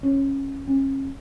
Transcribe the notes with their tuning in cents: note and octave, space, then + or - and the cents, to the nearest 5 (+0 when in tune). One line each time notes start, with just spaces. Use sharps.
C#4 -15
C#4 -35